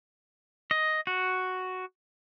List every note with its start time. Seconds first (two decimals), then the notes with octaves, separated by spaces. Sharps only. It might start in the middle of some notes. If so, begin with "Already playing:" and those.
0.71 D#5
1.07 F#4